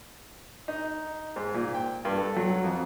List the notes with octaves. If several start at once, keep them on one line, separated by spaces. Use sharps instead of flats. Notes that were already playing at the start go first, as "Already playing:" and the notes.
D#4
G#2
A#2
G5
G2
A4
F#3
F2